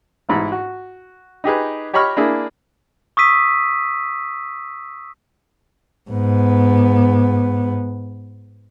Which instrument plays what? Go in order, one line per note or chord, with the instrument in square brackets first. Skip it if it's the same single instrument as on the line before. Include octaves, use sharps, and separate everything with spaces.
[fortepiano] A1 G#2 E4
F#4
D#4 G4 G#4 B4
G4 C#5 D#5 B5 C#6 F6
A#3 D4 E4 G#4
[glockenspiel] C#6 D#6 E6 B6 D#7
[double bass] G#2 B3